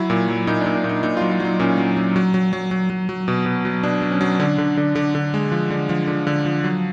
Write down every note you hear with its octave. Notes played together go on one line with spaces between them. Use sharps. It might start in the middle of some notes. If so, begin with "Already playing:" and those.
Already playing: F#3 E4
A#2
F#3
A#2 D#4
D4
A#2
D4
A#2
D#4
A#2 D#4
F4
F#3
F4
F#3 D#4
A#2 C#4
F#3
F#3
F#3
F#3
F#3
F#3
F#3
F#3
B2
B2
F#3
B2 D4
F#3
C#4
F#3
D3 D4
D3
D3
D3
D3
G#3
F3
D3
F3
D3
D3
F3
F#3